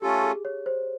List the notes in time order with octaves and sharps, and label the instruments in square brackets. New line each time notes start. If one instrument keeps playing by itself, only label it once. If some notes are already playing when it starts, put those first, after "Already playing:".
[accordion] A3 C#4 F4 A4 [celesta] G4
[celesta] G#4
C#5
C5